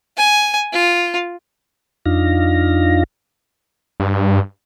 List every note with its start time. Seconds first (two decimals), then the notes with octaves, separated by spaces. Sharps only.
0.17 G#5
0.73 F4
2.05 F2 D4 D#4 F4 F5 A#6
4.00 G2